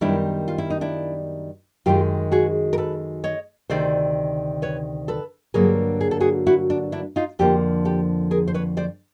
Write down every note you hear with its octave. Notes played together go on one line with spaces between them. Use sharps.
F#2 D#3 G3 B3 D4 E4
F4
E4
D#4
D4 E4
F#2 D#3 G#3 F4 G4
F#4 G#4
A#4
A4 B4
C#5 D#5
D2 C3 D#3 C5 D5
B4 C#5
A4 B4
G2 D3 F#3 A#3 G#4 A#4
G#4
A4
F#4 G#4
E4 F#4
D4
D4 E4
D#4 F4
F2 D3 F3 A#3 F4 G4
G4 A4
G#4 A#4
C5
B4 C#5
C5 D5